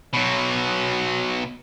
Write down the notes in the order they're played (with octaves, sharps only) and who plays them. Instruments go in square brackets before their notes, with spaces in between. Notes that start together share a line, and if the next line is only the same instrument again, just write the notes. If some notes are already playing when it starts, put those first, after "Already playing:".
[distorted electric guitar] B2 F#3